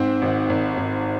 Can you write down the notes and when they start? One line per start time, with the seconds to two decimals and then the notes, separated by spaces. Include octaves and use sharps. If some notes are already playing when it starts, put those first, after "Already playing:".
Already playing: G#2 C4 C5
0.22 G#1
0.50 G#1
0.77 G#1